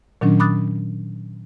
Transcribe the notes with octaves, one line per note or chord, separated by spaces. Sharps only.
A#2 D#3 F#3 C#4 D4
B5 D6 D#6 F#6 A6